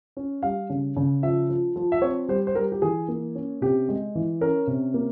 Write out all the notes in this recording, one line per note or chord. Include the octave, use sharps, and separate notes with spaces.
C#4
G3 F5
C#3
C#3
F3 E5
F3
F3
E5
C4 C#5
G3 C5
C5
G3 A#4
G4
E3 G#4
A#3
C#4
C3 G4
G#3
E3
C#4 A#4
C3
A#3